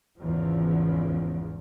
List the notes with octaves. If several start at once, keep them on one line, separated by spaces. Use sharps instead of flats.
G#1 E2 C#3 F3